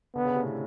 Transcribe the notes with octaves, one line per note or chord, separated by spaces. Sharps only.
D3 B3
C#3
C3
A2